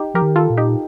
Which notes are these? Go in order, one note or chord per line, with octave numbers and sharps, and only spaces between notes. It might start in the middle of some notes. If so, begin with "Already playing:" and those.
Already playing: D#4 G4
F3 G4 A#4
D#3
F4 A4
A#2
D#4 G4